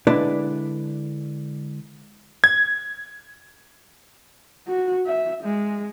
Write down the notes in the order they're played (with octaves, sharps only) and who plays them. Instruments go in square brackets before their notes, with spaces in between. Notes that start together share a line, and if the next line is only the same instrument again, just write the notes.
[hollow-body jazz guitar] D3 G#3 D4 E4 B4 D5
[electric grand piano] G#6
[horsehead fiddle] F#4
E5
G#3